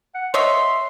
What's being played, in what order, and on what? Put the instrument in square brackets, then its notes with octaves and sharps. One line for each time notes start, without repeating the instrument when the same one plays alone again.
[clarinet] F#5
[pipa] C#5 D#5 E5 [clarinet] C6